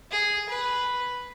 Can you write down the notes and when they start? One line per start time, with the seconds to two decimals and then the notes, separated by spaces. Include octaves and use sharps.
0.11 G#4
0.49 B4